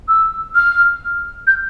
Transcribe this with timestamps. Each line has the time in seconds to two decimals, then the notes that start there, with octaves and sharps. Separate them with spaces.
0.08 E6
0.55 F6
1.47 G6